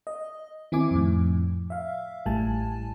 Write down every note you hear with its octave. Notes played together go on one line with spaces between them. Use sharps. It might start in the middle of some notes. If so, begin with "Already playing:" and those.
D#5
D#3 C4 E4 G#5 D6
F2 A2
E5 F5
A1 A2 G3 G#5 A5